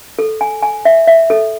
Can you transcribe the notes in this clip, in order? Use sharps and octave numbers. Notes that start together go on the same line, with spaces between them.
A4
G#5
G#5
E5
E5
A4